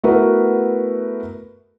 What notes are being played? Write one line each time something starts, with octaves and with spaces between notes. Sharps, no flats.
A3 B3 E4 F#4 A#4 B4